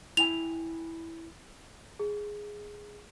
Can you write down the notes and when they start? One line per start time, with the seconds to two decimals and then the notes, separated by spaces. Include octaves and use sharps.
0.17 E4 G5 G#5 F7
1.99 G#4